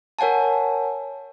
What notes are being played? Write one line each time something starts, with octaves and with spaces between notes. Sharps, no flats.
A#4 C#5 F#5 G#5 A5